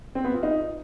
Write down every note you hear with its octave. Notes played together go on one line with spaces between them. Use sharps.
C4
B3
F4
D#4